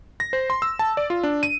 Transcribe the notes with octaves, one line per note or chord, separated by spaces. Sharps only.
A#6
C5
C6
E6
A5
D5
F4
D4
D#7